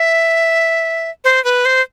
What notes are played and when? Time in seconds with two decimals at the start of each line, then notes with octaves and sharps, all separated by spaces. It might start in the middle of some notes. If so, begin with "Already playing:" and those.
Already playing: E5
1.24 C5
1.44 B4
1.65 C5